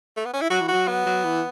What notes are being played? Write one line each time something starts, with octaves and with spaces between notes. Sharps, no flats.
A3
B3
C#4
E4
F#3 F#4
E3
F#3 F#4
B3
F#3
E3